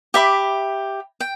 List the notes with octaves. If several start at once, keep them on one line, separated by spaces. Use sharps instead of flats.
G4 E5 B5 D6
G5